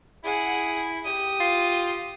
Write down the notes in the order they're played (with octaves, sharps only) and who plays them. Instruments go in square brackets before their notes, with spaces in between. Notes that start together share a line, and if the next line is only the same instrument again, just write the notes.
[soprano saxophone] E4 [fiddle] G#4 F#5
[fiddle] G4 D#6
[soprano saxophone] F4